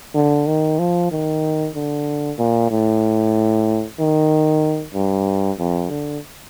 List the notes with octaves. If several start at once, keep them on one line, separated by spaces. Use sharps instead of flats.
D3
D#3
F3
D#3
D3
A#2
A2
D#3
G2
F2
D3